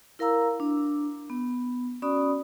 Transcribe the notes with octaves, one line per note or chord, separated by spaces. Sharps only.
E4 A#4 F5 A#5 E6
D4
B3
C#4 F#4 D5 B5 D#6